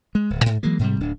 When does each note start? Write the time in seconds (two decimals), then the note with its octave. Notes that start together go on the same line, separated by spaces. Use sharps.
0.15 G#3
0.30 D1
0.46 G#2
0.63 E3 F#3 G#3 A#3
0.79 G#2 C3 G3
1.00 D1 D4